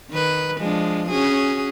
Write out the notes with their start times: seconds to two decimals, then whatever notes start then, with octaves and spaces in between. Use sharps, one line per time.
0.11 D#3 B4
0.59 F3 G#3 D4
1.09 C#4 F#4 G#4